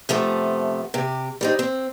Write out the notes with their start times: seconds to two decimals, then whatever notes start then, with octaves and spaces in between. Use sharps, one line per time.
0.09 C3 F3 A3 B3
0.94 C3 G4
1.41 G3 C4 D#4
1.59 C4